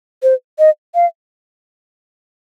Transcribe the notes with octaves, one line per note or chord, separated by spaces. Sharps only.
C5
D#5
F5